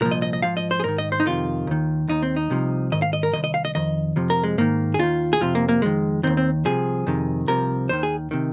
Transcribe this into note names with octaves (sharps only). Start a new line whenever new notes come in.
C2 A#2 F3 A#4
D#5
D#5
D#5
G#2 F3 F5
D#5
C5
G#4
G#2 D#3 A#4
D#5
C5
D#4
F2 C3 D#3 F4
D#2 D#3
D#2 D#3 D#4
C4
D#4
C2 C3 F3
G#2 D#3 D#5
F5
D#5
A#4
C2 C3 D#3 D#5
D#5
F5
D#5
F2 D#3 D#5
F2 C3 F3
A#4
G#3
G#2 D#3 A#3
G#4
D#2 D#3 F4
G#4
F2 C3 F3 F4
A#3
A#3
F2 D#3 G#3
D#2 D#3 C4
C4
C2 C3 F3 G#4
F2 C3 D#3
C2 C3 F3 A#4
D#2 D#3 C5
G#4
C3 D#3